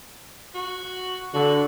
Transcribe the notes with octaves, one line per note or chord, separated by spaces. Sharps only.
F#4
D3 F#4